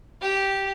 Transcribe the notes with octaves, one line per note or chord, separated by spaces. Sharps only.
G4